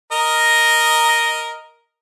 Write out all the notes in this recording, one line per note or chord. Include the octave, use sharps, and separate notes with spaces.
A#4 D#5